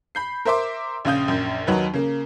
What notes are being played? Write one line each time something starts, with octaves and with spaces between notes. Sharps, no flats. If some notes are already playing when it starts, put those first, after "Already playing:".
B5 G6 C7
A#4 C5 E5 C6 D6
A#1 C#3 F5 D#6 G6
A#1 F#2
D#2 F#3 D#4 B4
C#3 A#3